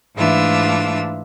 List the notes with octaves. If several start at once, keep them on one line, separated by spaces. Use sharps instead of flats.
G#2 E3 A3 D4 F4 E5